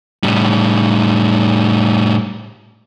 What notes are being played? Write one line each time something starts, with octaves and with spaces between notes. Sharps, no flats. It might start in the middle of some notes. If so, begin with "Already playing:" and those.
A2 G3